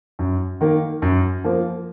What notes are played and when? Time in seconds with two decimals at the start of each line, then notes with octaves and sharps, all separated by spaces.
0.19 F#2
0.61 D#3 A#3
1.02 F#2
1.44 F3 A#3